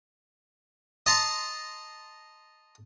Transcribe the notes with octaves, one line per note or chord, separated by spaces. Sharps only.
D#5 A5 A#5 C6